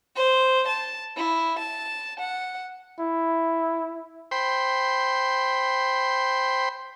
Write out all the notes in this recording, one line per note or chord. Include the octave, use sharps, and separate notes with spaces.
C5
A5
E4
A5
F#5
E4
C5 G5 B5 C6